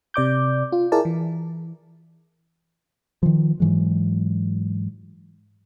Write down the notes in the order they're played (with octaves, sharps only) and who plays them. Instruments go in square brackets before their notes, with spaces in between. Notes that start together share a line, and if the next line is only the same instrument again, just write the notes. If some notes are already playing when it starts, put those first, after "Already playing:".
[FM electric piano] C3 D5 D6 G6
F4
E4 G#4 A#4 D5 A5
E3
[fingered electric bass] D#3 F3
G#2 E3 F#3 G#3